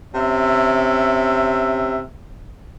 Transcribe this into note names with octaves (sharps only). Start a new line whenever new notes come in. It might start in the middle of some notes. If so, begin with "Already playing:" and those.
C3 C#4 E5